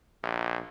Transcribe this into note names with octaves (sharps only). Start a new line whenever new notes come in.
A#1